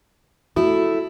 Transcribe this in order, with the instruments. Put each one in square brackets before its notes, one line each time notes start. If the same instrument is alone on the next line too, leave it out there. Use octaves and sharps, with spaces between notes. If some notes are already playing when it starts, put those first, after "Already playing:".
[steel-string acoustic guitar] A3 E4 [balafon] F#4